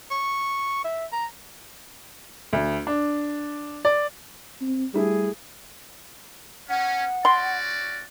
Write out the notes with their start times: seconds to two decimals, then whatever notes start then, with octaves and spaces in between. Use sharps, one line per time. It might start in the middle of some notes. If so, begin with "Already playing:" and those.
0.11 C#6
0.84 E5
1.12 A#5
2.53 D2
2.87 D4
3.85 D5
4.61 C4
4.94 G3 A3 E4 G4 G#4
6.70 C#4 F#5
7.25 C#4 F#4 D5 C6